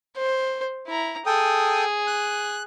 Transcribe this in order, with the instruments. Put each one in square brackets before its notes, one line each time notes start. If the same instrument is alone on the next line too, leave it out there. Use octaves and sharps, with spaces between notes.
[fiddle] C5
E4 A#5
[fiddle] G#4 [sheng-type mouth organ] A4 G5 D#6
[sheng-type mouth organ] F#6